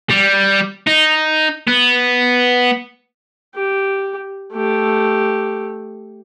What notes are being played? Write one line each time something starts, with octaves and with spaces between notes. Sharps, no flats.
G3
D#4
B3
G4
A3 G4